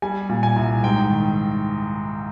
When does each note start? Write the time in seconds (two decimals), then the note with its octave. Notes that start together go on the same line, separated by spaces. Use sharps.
0.02 G3 G#5
0.29 A#2
0.43 G#5
0.56 C2
0.83 G#2 G5
1.10 D#3